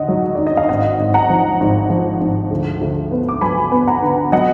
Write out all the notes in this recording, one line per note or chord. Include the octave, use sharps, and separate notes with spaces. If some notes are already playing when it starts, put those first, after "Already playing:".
Already playing: D#2 D3 D#5 F#5
F#3
D#2 D5
D#5
F5
G#1 D#5 F#5
G#1
F#5 A#5
F3
G#1
F3
G#1
D2
D2
B3
D6
F#3 G#5 B5
B3
F#5 A#5
D3
F#3 D#5 F#5